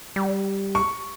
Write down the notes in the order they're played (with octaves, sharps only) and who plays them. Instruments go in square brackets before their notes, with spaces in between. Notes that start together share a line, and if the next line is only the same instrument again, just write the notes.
[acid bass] G3
[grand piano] C#6